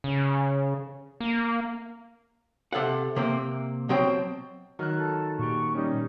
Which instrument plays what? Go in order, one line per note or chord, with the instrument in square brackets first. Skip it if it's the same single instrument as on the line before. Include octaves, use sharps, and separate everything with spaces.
[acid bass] C#3
A#3
[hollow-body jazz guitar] C3 A4 F5 F#5
C3 A#3 C4
B2 F#3 C4 C5 G5
[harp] D#3 [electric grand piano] F#3 F6 F#6
[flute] A4
[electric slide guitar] A#2 G4 [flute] C#6
[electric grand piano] G3 C#4 [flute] D#4